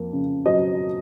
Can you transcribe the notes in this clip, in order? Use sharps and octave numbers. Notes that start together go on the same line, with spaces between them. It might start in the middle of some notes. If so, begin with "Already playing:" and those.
Already playing: F2 A#3
C#3
F#3 D#5